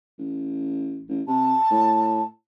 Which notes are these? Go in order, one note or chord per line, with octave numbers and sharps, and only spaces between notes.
A1
A1
C3 A5
A2